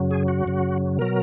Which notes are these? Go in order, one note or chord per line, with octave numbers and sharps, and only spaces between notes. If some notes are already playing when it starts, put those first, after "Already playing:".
Already playing: F#2 C#3 F#3
G#4
F#4
F#2 C#3 F#3
B2 F#3 A#4